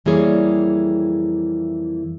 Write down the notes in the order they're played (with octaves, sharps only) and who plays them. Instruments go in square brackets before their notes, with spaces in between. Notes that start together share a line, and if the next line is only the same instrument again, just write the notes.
[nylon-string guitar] F2 E3 G3 A#3 G#4 C#5